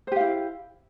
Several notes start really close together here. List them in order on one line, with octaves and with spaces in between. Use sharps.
C5 G4 F5 E4